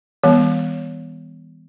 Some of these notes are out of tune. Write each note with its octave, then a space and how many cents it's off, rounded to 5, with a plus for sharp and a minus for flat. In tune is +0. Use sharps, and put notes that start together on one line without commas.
E3 -25 G3 +40 B3 +0